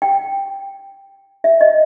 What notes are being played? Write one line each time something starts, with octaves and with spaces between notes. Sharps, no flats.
G5
E5
D#5